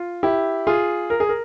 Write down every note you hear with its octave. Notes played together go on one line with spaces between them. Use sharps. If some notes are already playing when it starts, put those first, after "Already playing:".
Already playing: F4
E4 G4
F4 G#4
A#4
G#4
A#4